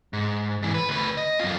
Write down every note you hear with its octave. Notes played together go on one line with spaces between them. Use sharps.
G#2
G#2 E3
B4
D2 B4
D#5
F#2 F4